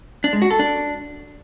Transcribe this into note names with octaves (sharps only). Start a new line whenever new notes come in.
D4
G#3
F#4
A4
D4